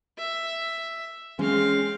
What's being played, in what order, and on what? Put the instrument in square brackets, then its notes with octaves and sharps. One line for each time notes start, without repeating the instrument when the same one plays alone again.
[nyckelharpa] E5
[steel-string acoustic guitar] G#3 C#4 [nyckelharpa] C4 F5